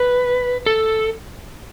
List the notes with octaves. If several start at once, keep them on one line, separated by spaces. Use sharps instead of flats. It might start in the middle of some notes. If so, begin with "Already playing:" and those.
Already playing: B4
A4